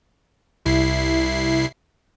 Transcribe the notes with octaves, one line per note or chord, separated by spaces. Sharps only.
C2 E4 C7